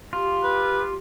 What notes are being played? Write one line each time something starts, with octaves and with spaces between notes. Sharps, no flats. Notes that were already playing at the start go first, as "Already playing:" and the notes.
F4 G4
B4